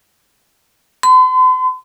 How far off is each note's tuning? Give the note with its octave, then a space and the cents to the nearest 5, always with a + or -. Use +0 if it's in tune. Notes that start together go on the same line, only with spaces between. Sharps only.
C6 -45